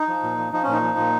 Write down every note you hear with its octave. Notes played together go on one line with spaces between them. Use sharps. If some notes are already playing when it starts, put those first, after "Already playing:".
Already playing: D#4
F3
A#2
F3
F3 D#4
A#2 C#4
D#4
F3
A#2